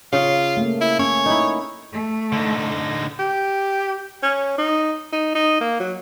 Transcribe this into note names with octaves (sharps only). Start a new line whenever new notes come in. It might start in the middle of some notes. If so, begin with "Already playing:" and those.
C#3 F4
A3 A#3
E4
C#4 C#5
D#4 E4
A3
D3 D#4
G4
C#4
D#4
D#4
D#4
A#3
F#3